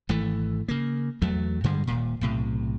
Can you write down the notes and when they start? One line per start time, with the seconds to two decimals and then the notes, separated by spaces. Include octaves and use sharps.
0.09 G#1 E3 A3
0.68 C#3 A#3
1.22 E2 F#3 A3
1.64 G2 D3 G3 G#3
1.87 D#1 A#2
2.21 B1 A2 C3